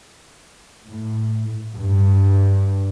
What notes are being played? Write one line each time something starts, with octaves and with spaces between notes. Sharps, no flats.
A2
G2